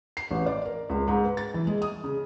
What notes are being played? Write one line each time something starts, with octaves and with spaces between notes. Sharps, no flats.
C7
A1
D5
A#4
C#2
G#2
B4
A6
E3
G#3
D#6
C#3